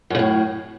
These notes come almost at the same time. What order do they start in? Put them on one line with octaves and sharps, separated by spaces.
F#2 C#3 A2